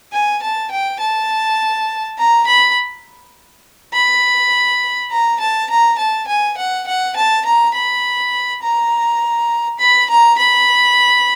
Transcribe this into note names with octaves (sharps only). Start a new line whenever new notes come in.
G#5
A5
G5
A5
A#5
B5
B5
A#5
A5
A#5
A5
G#5
F#5
F#5
A5
A#5
B5
A#5
B5
A#5
B5